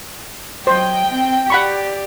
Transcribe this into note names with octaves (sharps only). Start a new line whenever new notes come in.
F#3 C5 D#5 G5
C4
G4 D5 F#5 B5 C#6